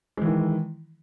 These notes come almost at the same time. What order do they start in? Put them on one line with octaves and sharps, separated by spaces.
G#3 E3 D#3